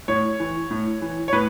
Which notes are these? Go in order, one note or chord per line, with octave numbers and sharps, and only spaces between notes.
A2 C#5
E3
A2
E3
C#5
A2 B4